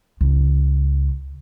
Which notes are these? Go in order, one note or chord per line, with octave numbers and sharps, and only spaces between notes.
C#2